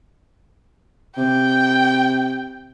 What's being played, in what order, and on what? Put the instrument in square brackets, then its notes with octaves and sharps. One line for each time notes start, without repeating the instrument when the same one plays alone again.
[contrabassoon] C3 [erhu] G5